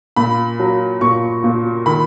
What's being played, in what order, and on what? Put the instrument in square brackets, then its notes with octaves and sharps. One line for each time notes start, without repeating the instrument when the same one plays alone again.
[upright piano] A#2 B5
F#3
A#2 C#6
A#2
D#3 B5